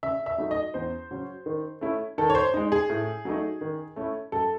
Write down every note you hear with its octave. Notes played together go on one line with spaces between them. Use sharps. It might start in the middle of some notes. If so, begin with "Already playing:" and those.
C#3 E5
E5
F#3 A3 D#4
D#5
E2 C5
C#3 F#3 C#4
D#3
A3 C#4 E4
D#3 A4
C#5
C5
G#3 D#4
G#4
A2
F#3 A3 D#4
D#3
A3 C#4 E4
F#2 A4